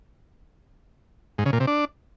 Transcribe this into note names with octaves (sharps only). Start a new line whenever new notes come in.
G#2
C#3
A#2
C3
D4